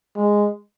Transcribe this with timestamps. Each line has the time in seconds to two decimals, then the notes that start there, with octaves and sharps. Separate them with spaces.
0.16 G#3